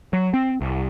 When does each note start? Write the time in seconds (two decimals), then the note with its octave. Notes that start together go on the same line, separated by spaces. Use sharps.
0.13 F#3
0.34 C4
0.61 C2